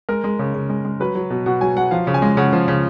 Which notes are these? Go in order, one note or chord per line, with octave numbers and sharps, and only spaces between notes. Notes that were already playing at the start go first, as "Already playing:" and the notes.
G#3 A#4
G#3
C#3
C#3
G#3
G#3
F#3 B4
F#3
B2
B2 F#5
F#3 G#5
F#3 F#5
F3 F5
C#3
G#5
G#3
C#3 F#5
F3
C#3